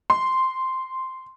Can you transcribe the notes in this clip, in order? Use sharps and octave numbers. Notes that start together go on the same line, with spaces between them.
C6